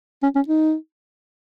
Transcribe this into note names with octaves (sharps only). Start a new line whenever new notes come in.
C#4
C#4
D#4